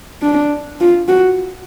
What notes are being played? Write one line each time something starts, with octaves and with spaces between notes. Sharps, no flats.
D4
F4
F#4